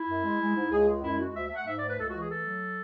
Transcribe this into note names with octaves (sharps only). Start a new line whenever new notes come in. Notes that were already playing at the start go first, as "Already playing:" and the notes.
Already playing: E4
F#2
G#3
G#3
G#2
C#2 G#4
G#3
F#2 E4
G#3 F#4
D2 E5
A3 E5
F#5
G#2 E5
D5
A3 B4
C#2 A4
F#4
E3 G#4
A3 A4
F#3